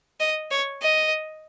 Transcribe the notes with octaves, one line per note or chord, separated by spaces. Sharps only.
D#5
C#5
D#5